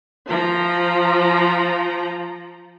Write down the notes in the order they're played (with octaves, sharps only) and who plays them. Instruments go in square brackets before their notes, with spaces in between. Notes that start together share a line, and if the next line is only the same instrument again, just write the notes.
[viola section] F3 A#5